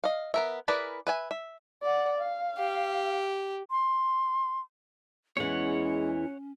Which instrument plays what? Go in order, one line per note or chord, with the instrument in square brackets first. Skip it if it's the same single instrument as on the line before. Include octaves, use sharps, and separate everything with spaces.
[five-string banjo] D#5 F5
B3 A#4 E5
E4 G#4 A#4 B4 D5
B4 E5 G#5
E5
[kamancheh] D5 F#5
F5
[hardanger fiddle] G4
[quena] C6
[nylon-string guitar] E2 E3 [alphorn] G#3 [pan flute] C#4 [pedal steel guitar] C#5 F#5